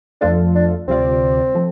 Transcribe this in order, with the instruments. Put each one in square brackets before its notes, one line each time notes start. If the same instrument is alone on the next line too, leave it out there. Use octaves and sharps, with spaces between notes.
[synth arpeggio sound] F2 F3 A3 F4 A4 [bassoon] D4
[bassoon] D4
[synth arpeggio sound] D2 C3 G3 F4 D5 [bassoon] C4
[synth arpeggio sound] F3 A3